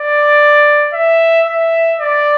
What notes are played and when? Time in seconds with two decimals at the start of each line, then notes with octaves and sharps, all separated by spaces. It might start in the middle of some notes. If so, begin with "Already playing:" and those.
Already playing: D5
0.94 E5
1.47 E5
1.99 D5